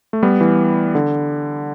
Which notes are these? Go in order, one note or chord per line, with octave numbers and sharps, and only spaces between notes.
A3
G3 B3
E3
D3